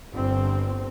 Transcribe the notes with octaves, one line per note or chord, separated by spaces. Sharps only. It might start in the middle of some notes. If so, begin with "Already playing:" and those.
G1 C4